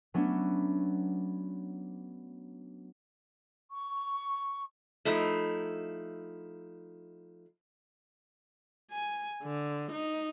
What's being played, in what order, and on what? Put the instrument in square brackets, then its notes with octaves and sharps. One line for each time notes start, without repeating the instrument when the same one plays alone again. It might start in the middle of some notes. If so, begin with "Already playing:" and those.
[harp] F#3 A3 B3 C#4 D4
[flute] C#6
[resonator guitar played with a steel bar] F3 A3 D#4 E4
[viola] G#5
D3
D#4